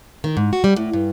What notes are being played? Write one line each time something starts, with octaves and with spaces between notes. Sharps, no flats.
D#3
G#2
F#4
G3
A2
G2